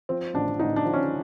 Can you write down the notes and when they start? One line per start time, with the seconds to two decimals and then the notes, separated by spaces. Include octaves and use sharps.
0.09 F3 C4
0.34 A1 D4
0.59 A1 D#4
0.76 D4
0.85 F3
0.94 C#4